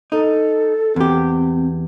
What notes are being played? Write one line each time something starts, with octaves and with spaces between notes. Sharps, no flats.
D#4 A4
E2 C4 G4